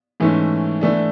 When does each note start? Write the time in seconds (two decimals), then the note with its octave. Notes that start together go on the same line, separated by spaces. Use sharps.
0.20 G#2 E3 A3 C#4
0.81 E3 A3 D4